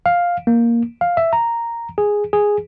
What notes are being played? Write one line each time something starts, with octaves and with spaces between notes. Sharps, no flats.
F5
A#3
F5
E5
A#5
G#4
G#4